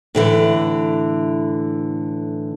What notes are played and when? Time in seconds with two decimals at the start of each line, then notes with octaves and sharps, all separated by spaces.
0.15 A2 D3 E3